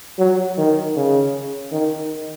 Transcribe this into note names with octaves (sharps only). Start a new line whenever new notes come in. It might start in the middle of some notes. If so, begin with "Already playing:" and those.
F#3
D#3
C#3
D#3